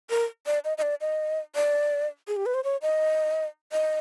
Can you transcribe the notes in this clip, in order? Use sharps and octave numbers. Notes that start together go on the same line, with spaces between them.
A#4
D5
D#5
D#5
D5
D#5
D5
G#4
G4
B4
C5
C#5
D#5
D#5